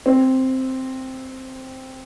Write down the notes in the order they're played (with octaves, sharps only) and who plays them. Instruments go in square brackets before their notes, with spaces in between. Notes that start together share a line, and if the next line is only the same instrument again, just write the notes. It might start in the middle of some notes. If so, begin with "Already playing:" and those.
[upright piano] C4